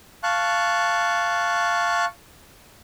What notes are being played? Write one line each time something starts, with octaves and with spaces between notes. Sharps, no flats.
F5 A5 C#6 F#6